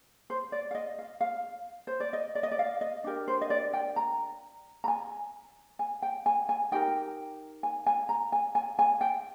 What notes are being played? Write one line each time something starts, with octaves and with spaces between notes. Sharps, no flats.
C5
D5
F5
D#5
F5
F5
C5
D5
D#5
D5
D#5
D5
F5
D#5
D4 G4 A#4
C5
D#5
D5
G5
A#5
A#5
G#5
G#5
G5
G#5
G#5
D#4 G4 A#4 G5
G#5
G#5
A#5
G#5
G#5
G#5
G5